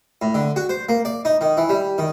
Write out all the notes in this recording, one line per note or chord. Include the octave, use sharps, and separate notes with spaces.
A2
D3
F#4
C5
A#3
D5
D#4
D#3
E3
G3
D#3